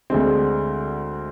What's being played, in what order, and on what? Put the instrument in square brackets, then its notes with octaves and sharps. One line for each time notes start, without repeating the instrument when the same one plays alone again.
[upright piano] D2 D3 G#3 C4